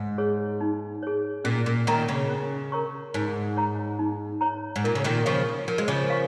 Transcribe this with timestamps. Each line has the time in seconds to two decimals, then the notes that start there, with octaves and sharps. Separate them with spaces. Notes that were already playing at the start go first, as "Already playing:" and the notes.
Already playing: G#2
0.18 G#4 C#5
0.61 D#4
1.03 G#4 C#5
1.44 A#2 C#4
1.66 A#2
1.87 A#2 D#3 A#4 C#5 A#5 C#6
2.09 C#3
2.29 C#4
2.72 A#4 C#5 A#5 C#6
3.14 G#2 D#4
3.57 C#5 A#5
3.99 D#4
4.41 C#5 A#5
4.76 G#2
4.84 A#2 A#4
4.95 C#3
5.04 A#2 D#3
5.26 C#3 F3 F5 C#6
5.68 F3 A#4
5.78 G#3
5.88 C#3 F3
6.10 F5 C#6